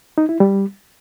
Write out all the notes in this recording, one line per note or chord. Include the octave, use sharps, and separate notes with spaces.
D#4
E4
G3